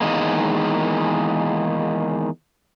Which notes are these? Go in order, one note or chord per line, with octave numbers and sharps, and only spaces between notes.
E2 D#3 G#3 A#3